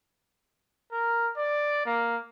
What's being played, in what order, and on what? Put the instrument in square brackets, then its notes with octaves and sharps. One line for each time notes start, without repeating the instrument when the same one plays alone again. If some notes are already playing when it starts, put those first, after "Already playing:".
[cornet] A#4
D5
A#3